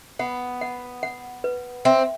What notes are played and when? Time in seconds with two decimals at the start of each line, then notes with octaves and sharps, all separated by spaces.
0.19 B3 F#5
0.61 F#5
1.03 F#5
1.44 B4
1.85 C4 E5